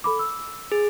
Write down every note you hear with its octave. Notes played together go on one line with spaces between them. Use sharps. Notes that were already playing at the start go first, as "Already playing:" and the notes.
A4 B5 D6
E6
G#4